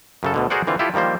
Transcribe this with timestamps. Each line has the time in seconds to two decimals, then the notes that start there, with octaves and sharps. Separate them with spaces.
0.23 F#2 C#3 A4
0.34 D2 B2 D3
0.50 F#4 G#4 A#4 C5 D5 F#5
0.67 D3 E3 C4 F4
0.79 E4 F4 G4 A4
0.94 D#3 F3 G3 A#3 C5